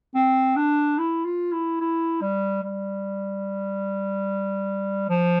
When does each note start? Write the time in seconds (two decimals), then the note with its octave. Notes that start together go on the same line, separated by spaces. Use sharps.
0.15 C4
0.56 D4
0.98 E4
1.25 F4
1.52 E4
1.80 E4
2.21 G3
2.63 G3
5.09 F3